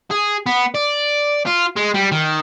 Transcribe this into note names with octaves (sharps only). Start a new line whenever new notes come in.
G#4
B3
D5
F4
G#3
G3
D#3